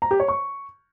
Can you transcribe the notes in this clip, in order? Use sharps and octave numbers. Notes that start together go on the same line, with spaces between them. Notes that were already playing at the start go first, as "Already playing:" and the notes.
A#5
G4
C#5
C#6